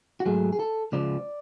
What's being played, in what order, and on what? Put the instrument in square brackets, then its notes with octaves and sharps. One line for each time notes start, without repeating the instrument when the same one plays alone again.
[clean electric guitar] F#4
G#2 F#3 A3 G#4
G#4
A4
C#2 C#3 F3 D5